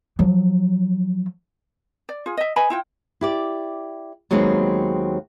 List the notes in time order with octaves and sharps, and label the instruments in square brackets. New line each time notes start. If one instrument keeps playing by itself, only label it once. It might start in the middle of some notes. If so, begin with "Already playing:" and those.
[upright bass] F3 F#3
[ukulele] D5
F4 G#4
D#5 E5
B4 D#5 G#5 B5
E4 F4 G5
[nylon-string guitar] E4 G4 D5
D#2 F#3 G#3 B3 C4 D#4